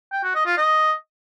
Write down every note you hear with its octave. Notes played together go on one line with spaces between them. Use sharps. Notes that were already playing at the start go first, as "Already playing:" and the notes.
G5
F#4
D#5
F4
D#5